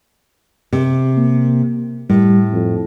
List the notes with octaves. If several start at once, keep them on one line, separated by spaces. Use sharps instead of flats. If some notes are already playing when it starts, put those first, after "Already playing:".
C3
A#3
A2 G3
F2